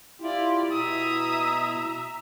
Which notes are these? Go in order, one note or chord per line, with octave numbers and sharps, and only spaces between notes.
E4 F4 G4 D5
B2 E4 E5 A#5 D#6